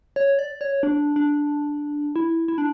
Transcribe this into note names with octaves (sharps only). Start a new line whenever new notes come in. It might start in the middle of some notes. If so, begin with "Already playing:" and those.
C#5
D5
C#5
D4
D4
E4
E4
D4